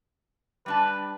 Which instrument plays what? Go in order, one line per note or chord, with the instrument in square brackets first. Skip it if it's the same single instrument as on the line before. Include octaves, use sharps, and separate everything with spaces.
[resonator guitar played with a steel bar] G3 D4 A5 [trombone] B4